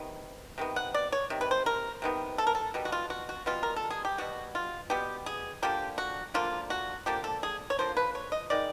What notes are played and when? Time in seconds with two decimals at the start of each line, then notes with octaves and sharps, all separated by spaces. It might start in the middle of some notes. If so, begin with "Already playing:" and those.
Already playing: C3 D#3 B3
0.58 C3 D#3 B3
0.76 F#5
0.94 D5
1.12 C#5
1.30 C3 D#3
1.41 B4
1.51 C5
1.66 A#4
2.02 C3 D#3 B3
2.38 A4
2.47 A#4
2.55 A4
2.74 B2 G3 B3
2.85 F#4
2.92 F4
3.10 F#4
3.29 F#4
3.46 B2 G3 B3 F4
3.63 A#4
3.76 A4
3.90 G#4
4.05 G4
4.18 B2 G3 B3 F#4
4.55 F4
4.90 B2 G3 B3 G4
5.26 G#4
5.62 D3 F3 A#3 G4
5.98 F#4
6.34 D3 F3 A#3 F4
6.70 F#4
7.06 D3 F3 A#3 G4
7.24 A4
7.43 G#4
7.70 C#5
7.79 D3 F3 A#3 C5
7.97 B4
8.15 C#5
8.32 D#5
8.50 D#3 G#3 D5